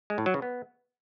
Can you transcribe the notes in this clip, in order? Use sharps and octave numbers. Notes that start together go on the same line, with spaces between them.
G#3
A2
F#3
C#3
B3